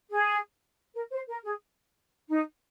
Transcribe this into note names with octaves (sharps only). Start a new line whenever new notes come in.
G#4
A#4
C5
A#4
G#4
D#4